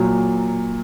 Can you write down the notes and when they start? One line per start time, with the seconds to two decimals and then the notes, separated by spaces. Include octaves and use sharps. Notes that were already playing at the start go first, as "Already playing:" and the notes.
Already playing: A#2 F#3